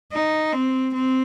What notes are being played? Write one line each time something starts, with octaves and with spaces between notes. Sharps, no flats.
D#4
C4
C4